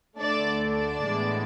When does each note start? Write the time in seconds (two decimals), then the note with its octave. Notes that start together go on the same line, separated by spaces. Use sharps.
0.20 D2 D3 A3 D4 D5
0.62 D4 D5
1.06 A2 E3 G#3 B3